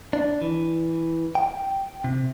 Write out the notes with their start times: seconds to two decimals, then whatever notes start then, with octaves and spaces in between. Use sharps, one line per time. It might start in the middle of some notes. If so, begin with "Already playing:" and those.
0.13 D4
0.42 E3
1.35 G5
2.04 C3